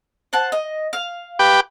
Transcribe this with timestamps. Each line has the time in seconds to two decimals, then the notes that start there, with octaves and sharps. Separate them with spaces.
0.33 C5 F#5 A5
0.52 D#5
0.93 F5
1.39 G4 B4 G5